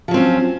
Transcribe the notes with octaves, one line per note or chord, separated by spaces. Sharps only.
F3 F#3 C4 C#4